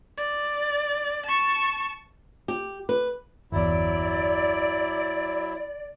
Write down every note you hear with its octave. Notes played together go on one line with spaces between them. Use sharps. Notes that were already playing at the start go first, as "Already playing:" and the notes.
D5
A5 C#6
G4
B4
G1 E2 F#3 E4 D5